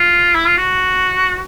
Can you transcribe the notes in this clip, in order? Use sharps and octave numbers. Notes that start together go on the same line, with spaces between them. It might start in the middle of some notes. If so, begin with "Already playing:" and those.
Already playing: F4
E4
F4
F#4